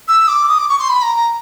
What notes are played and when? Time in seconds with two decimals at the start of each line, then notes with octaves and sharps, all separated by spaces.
0.08 E6
0.28 D6
0.49 D#6
0.58 D6
0.69 C#6
0.79 C6
0.89 B5
1.02 A#5
1.16 A#5